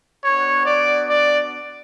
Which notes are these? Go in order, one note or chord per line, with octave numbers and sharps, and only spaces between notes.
B3 D4 F#4 C#5
D5
D5